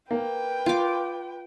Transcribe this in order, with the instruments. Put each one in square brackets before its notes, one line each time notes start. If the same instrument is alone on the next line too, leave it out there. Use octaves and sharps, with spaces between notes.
[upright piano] A#3 [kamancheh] B4 G5
[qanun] F4 D6